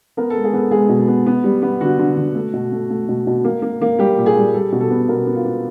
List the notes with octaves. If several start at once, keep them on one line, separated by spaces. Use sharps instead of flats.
B3 A#4
G#3 A4
G#4
B3 A4
G#3 G#4
B2
B3
B3
G3
B3
D3 F#4
D3
D3
A3
B2
A3
A3
B2
B2
A#3
A#3
A#3
G3 G4
A#2
G#4
G3
G3 A4
B2
A4
B3
B2 A#4
B3
F4
B3